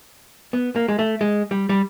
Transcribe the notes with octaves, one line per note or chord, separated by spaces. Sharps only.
B3
A#3
G#3
A3
G#3
G3
G3